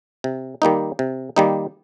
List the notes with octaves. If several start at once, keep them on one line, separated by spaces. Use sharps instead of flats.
C3
D#3 G3 A#3 D#4
C3
D#3 G3 A#3 D#4